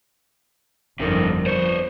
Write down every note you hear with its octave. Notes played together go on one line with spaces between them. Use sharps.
G1 F2 C3 D#3 A#3 C#4 A#4
F3 C5 C#5